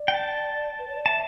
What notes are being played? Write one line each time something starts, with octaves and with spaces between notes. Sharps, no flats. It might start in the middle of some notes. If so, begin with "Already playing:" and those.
Already playing: D5
G5
A5
B4
C#5
D5
E5 A5